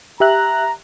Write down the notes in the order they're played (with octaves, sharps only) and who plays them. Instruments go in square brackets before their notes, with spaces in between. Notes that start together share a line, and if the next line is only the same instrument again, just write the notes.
[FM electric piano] G4 E5 F#6 [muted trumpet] A#5